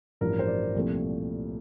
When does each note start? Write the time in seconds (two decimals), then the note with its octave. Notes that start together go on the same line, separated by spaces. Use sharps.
0.21 A1 G2 F3 A#4
0.39 C5
0.47 D5
0.75 C2 A#2 F3 A3 C4